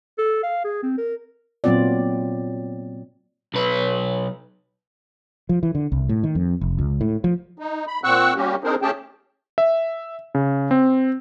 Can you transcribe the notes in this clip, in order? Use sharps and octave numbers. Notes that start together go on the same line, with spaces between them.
A4
F5
G#4
C4
A#4
A#2 F#3 B3 C4 F4 D5
B1 B4
F3
E3
D3
C2
A2
D#3
F2
F1
C#2
A2
F3
D#4
B5
A#2 C4 F#5 C#6 E6 F#6
G3 A#3 C#4 F#4 G4
C4 D4 D#4 G#4 A#4 C5
A3 C#4 G4 G#4 G5 A5
E5
C#3
C4